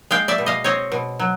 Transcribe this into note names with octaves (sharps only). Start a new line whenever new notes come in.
G#3 F5 G5
D5 E5
B2
D#5 F5
C4 C#5 D#5
B2
F#3